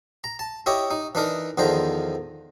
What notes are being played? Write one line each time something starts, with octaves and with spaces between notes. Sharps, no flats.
A#5
A5
E4 G4 C#5 D#5
D#4
E3 D4 D#4 A#4
E2 D3 D#3 F3 C5 A#5